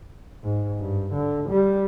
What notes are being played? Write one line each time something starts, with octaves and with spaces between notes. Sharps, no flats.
G#2
G2
D3
G3